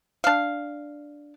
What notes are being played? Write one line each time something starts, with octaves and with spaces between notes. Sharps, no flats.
D4 F5